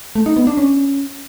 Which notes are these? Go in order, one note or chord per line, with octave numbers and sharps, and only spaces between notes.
A3
D#4
B3
D4
C#4